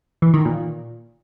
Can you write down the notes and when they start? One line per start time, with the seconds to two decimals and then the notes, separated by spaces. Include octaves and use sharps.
0.22 E3
0.34 D#3
0.45 A#2